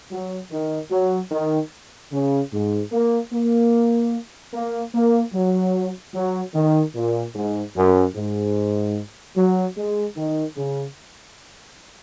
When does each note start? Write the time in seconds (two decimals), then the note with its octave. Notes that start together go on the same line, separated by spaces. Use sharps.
0.11 F#3
0.51 D#3
0.91 F#3
1.31 D#3
2.13 C#3
2.52 G#2
2.92 A#3
3.33 A#3
4.54 A#3
4.94 A#3
5.34 F#3
6.14 F#3
6.54 D#3
6.95 A#2
7.35 G#2
7.76 F#2
8.15 G#2
9.37 F#3
9.77 G#3
10.17 D#3
10.57 C#3